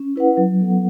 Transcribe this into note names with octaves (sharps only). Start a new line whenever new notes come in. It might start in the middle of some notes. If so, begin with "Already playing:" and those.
Already playing: C#4
E4 B4 F#5
F#3
B3 A4 F#5